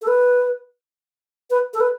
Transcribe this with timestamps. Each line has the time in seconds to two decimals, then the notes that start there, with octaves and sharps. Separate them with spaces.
0.02 A4
0.07 B4
1.50 B4
1.73 A4
1.80 B4